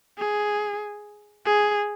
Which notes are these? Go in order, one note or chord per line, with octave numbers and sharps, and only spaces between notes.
G#4
G#4